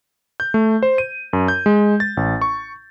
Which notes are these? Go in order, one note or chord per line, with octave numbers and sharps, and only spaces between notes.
G6
A3
C5
D#7
F#2
G6
G#3
A6
A1
C#6